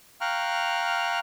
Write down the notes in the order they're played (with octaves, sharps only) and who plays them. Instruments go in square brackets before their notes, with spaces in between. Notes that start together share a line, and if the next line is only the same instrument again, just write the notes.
[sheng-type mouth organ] F5 G5 A#5 C#6 F6 F#6